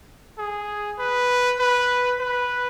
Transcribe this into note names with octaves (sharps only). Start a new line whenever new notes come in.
G#4
B4
B4
B4